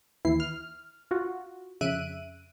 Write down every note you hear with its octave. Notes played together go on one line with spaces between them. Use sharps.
D#2 E3 E4 C7
F6
F4 F#4
F2 C#3 E5 F#6 D7 D#7